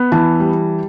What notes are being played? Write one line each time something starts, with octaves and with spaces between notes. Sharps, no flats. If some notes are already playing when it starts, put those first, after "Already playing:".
Already playing: B3
E3 A5
G3